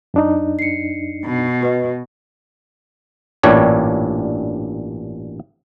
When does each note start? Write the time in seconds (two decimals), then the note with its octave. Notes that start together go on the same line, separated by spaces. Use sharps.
0.14 F#2 D4 D#4
0.59 C7 C#7
1.25 B2
1.61 F#4 B4 D#5
3.43 A1 G2 A#2 G3 D4 C#5